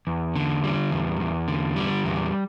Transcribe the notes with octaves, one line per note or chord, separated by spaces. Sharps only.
E2
D3
G3
E2
E2
D3
G3
E2